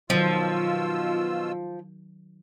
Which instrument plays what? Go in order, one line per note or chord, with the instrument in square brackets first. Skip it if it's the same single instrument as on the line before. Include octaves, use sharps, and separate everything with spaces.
[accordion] B2 F4 E6 [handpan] D#3 F#3 [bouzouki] F3